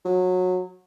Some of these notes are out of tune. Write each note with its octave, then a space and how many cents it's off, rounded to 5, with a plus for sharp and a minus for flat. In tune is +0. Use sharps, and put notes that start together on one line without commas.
F#3 -20